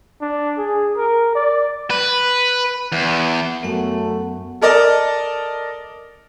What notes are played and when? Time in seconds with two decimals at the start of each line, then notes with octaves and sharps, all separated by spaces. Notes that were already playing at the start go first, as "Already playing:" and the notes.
0.21 D4
0.58 G#4
0.97 A#4
1.35 D5
1.90 B4
2.92 E2
3.63 F#2 F#3 A3 B3 F#5
4.61 A4 A#4 D5 D#5 A5